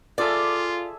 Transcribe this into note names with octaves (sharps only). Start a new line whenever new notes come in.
F4 G#4 A4 D5 E5